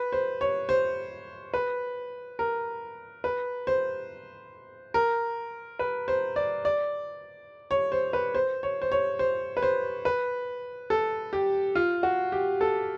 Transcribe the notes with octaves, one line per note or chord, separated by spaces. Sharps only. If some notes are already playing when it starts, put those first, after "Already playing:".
Already playing: B4
C5
C#5
C5
B4
A#4
B4
C5
A#4
B4
C5
D5
D5
C#5
C5
B4
C5
C#5
C5
C#5
C5
B4
C5
B4
A4
G4
F4
F#4
G4
A4